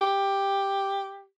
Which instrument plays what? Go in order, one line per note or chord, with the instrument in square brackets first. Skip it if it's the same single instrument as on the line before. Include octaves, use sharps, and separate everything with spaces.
[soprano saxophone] G4